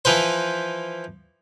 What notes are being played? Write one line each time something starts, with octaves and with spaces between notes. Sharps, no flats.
E3 F3 B4 C5